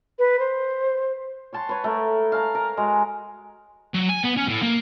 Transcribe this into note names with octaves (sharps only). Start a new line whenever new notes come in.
B4
C5
C#5 F#5 A5 C6
B4 C#5
A3 A#4
F5 A5 A#5
A#4
G#3 F#4
F#3
G#5
B3
C#4
A2
A#3